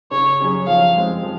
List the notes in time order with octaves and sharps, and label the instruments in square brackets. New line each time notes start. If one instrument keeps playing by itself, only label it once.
[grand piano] C#3 [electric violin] C#5
[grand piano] F#3 C#4 G#4
[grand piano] F3 [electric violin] F5
[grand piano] G#3 C4
F3